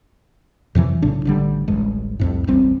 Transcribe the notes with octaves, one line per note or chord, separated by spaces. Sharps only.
F2 C3 E3 F#3
B1 A2 C#3 D4
A1 D3 G3
D1 A1 G2 G#3
C2 F2 A2
E1 A1 G3 C4